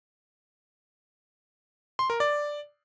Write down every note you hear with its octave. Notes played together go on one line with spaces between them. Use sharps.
C6
A#4
D5